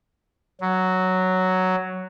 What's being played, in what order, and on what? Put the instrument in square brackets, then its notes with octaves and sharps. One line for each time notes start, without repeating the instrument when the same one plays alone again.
[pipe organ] F#3